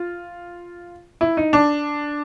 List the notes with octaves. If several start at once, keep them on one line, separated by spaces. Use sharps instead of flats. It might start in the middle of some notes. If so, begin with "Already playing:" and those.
Already playing: F4
E4
D#4
D4